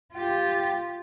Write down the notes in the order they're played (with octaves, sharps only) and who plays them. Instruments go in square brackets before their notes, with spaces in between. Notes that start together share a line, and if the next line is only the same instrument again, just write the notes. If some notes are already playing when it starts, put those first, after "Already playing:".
[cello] F4 G4